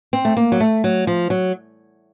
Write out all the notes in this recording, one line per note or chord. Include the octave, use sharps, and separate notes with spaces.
C4
A3
A#3
F#3
A3
F#3
F3
F#3